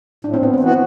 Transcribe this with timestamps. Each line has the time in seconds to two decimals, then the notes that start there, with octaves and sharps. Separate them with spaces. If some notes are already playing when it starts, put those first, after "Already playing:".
0.24 A2 D4
0.34 C4
0.43 B3
0.53 C4
0.60 E3 B3 F#4